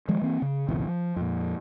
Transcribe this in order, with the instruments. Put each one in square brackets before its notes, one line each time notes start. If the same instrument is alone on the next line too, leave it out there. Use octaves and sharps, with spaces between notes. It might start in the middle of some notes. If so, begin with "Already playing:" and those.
[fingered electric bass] D#3 F3 G#3
E3 A#3 C4
C#3
G#1 C#2 B2 E3
F3
F2 A#2